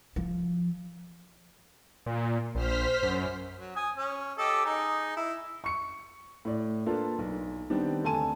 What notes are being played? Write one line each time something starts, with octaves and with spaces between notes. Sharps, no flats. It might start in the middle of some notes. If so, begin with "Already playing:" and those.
F3
A#2
A#1 C5 F6 B6
F#2
F#3
G#5 D#6
C#4
G4 A4 D#5
D#4 G#4
E4
C#6 C#7
A2 D5
A#3 D4 F4 A4 B4
B1
D#3 G3 B3 C4 D4
D2 C3 A4 G#5 A5 D#7